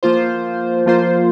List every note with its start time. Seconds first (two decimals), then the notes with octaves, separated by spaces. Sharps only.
0.03 F3 A#3 F4 C5
0.86 F3 A#3 F4 C5